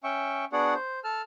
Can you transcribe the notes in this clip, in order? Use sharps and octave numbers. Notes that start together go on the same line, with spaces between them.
C#4 E5 G5 C#6
B3 D4 F#4 G#4 D5 F#5
C5
A4 A5 F6